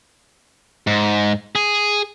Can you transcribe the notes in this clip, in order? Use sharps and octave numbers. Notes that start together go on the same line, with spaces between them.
G#2
G#4